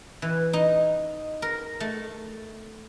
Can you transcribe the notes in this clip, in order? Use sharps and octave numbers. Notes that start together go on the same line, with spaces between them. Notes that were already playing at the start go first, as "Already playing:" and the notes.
E3
D#4
A#4
A3